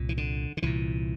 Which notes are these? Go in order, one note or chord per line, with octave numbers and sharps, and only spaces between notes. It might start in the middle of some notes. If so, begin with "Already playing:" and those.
Already playing: C2 A#2
E3
D3
D3
C2 A#2 E3